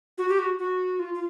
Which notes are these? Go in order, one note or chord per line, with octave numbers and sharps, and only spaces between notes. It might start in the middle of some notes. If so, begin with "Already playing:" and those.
F#4
G4
F#4
F#4
F4
F4